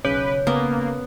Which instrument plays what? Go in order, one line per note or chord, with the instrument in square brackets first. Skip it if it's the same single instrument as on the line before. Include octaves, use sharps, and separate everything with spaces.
[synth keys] B1 C#3 G6 [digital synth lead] B4 [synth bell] C#5
[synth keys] C#3 [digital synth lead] A#3 [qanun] B3